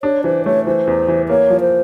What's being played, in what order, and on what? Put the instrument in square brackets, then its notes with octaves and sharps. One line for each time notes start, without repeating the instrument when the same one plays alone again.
[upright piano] D4 [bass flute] C#5
[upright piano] E3 [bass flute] C5
[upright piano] A3 [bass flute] C#5
[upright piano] E3 [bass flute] C5
[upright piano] E2
E3
[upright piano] A#3 [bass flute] C#5
[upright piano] F3
[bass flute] C5